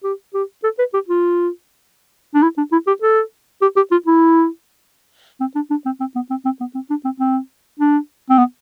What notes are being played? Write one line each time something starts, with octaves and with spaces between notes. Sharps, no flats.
G4
G4
A4
B4
G4
F4
D4
E4
D4
E4
G4
A4
G4
G4
F4
E4
C4
D4
D4
C4
C4
B3
C4
C4
B3
C4
D4
C4
C4
D4
C4
B3